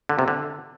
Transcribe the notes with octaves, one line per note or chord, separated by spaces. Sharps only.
D3
C3
D3